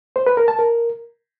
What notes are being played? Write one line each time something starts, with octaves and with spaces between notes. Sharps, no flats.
C5
B4
A#4
A5
A#4